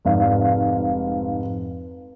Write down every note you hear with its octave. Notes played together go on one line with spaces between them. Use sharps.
F1 G#2 F5